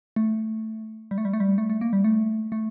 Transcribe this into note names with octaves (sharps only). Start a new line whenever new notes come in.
A3
G3
A3
G3
A3
G3
A3
A3
A#3
G3
A3
A3